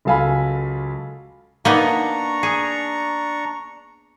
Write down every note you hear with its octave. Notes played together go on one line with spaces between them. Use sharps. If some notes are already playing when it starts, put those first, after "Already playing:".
C#2 F#3 A4 F5 G#5 B5
A#3 B3 D4 D#4 A#5 C#6
G#4